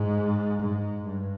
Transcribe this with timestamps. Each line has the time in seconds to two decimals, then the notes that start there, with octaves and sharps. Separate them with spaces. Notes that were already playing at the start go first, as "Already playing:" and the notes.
Already playing: G#2
0.60 G#2
1.04 G2